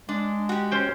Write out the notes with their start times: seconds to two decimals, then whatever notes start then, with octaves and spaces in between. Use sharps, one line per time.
0.09 G#3 D4
0.49 F#4 G4
0.72 C#4 C5 G5